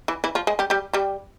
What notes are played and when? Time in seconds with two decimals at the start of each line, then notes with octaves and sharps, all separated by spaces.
0.08 E3 E4
0.24 E3 E4
0.35 F3 F4
0.47 G#3 G#4
0.59 G3 G4
0.70 G3 G4
0.93 G3 G4